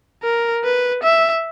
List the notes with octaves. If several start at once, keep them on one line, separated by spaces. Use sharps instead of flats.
A#4
B4
E5